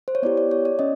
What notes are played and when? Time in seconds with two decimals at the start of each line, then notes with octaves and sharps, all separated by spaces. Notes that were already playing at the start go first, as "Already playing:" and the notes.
0.08 C5
0.15 C#5
0.23 B3 E4 G4 D5
0.37 D5
0.51 C#5
0.65 D5
0.79 C#4 D#5